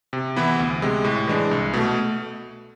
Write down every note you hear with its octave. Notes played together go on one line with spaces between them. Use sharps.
C3
E3 B3 E4
D2
C3 G#3
A2
E3 G#3 D4
C2
B2 A3